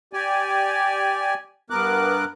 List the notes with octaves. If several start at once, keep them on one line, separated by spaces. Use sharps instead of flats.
G4 D5 G#5
G2 B3 A#4 D6 F#6